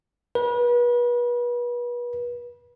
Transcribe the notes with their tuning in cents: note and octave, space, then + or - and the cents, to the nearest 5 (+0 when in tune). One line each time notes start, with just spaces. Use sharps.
B4 -35